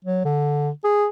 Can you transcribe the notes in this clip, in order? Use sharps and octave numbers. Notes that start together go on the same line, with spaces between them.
F#3
D3
G#4